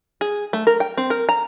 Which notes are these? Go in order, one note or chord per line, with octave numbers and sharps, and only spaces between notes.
G#4
A3
A#4
G5
C4
A#4
A#5